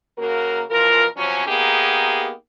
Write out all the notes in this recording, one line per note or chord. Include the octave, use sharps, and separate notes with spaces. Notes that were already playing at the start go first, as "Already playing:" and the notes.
C#3 A#3 F#4 A#4
B2 E3 F3 F4 A#4
C3 F3 F#3 C#4
A#3 B3 D#4 G4 G#4